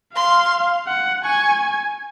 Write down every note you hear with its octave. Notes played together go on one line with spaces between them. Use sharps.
F5 C6
F#5
G#5 C#6